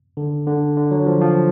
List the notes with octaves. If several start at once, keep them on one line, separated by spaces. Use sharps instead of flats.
D3
D3
D3
F#3
F3
F3